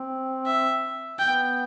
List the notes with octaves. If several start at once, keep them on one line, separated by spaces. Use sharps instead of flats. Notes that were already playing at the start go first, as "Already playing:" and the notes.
Already playing: C4
E5
B3 G5